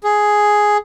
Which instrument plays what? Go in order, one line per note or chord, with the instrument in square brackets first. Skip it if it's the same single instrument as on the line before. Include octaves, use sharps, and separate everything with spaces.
[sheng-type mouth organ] G#4